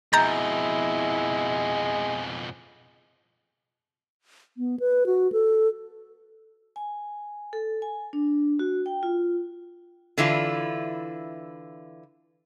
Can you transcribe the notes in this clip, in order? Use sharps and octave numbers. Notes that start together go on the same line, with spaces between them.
F2 B2 G#3 E4 A#5 G6 A6
B3
B4
F#4
A4
G#5
A4
G#5
D4
F#4
G5
F4
D3 E3 E4 F4